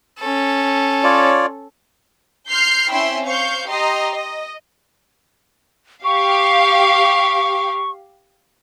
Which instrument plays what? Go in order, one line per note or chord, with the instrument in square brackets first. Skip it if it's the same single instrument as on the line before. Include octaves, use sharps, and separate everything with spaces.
[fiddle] C#4 A4
[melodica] F4 C#5 D5
[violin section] C6 F6 G6 C7
C4 C#4 E4 E5 G5 C6
C5 F5 C#6 G6
G4 D#5 A#5 C6
D#5
[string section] G4 F5 [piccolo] C#6